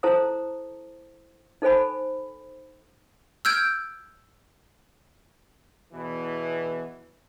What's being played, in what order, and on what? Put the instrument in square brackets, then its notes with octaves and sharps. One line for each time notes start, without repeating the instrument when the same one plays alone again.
[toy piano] E4 A4 C5 A5 A#5 D#6
D#4 A4 C5 G#5 B5
[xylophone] E6 F6 G6 G#6 D7
[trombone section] E2 B2 E3